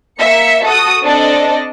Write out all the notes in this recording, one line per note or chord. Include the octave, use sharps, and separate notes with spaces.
A#3 E5 C#7
F#4 A4 D#6
C4 D4 A4 D5 D#5